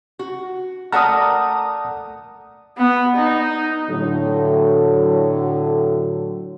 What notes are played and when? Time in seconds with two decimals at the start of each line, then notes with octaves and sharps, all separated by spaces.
0.19 F#4
0.92 A3 A#4 D5 F#5 A5 A#5 D#6 F6
2.78 B3
3.17 D#4
3.90 A2 D3 F#3